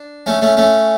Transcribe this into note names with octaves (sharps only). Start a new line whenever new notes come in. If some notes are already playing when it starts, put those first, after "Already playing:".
Already playing: D4
A3 C#4
A3 C#4
A3 C#4